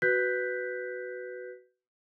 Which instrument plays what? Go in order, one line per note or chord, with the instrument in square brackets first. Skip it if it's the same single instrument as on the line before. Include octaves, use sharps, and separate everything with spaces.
[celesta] F#4 B4 F#6 G6 B6